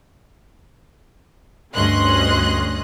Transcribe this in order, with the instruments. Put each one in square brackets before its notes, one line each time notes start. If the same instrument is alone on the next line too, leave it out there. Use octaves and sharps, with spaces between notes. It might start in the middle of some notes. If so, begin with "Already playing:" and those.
[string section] D2 G2 C#4 D#5 C6 F#6